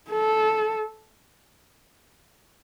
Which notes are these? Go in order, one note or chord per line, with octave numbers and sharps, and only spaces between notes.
A4